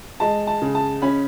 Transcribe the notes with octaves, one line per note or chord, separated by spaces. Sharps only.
G#3 A5
A5
C#3
A5
C#4 B5